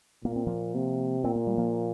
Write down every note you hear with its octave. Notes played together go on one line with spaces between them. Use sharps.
A#2 A#3
C4
F3 A#3
C3
A#2 C4
A#3
G3
F3 A#3